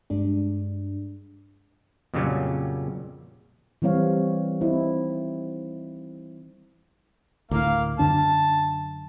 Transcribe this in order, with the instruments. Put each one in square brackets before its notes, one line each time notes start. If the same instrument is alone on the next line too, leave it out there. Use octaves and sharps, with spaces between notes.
[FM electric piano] G2 G3 G#3 D4
[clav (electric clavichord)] F2 A#2 C#3 F#3 G3 C#4
[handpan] E3 G3 C4 C#5 F5
C4 D#4 E4
[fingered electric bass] D2 A2 [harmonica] A#3 F5
[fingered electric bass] F#2 D3 D4 [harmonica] A5